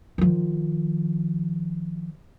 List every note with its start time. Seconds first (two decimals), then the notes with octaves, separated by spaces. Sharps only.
0.18 D#3 F3